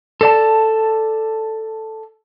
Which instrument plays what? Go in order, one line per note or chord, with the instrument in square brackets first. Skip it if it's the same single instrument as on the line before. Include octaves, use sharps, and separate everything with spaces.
[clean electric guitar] A4 D5 A5